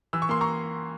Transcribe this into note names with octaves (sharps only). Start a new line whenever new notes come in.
E3 E6
C#6
A#3 C6
A#5 C#6